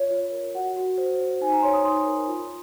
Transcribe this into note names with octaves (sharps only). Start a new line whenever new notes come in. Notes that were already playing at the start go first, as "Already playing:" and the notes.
Already playing: F4 C#5
F4
A#4
F#4 F#5
F#4
C5
C5
D#4 G#5
A#5
C#5 C6
D#6
D#4 C6
A#4
F4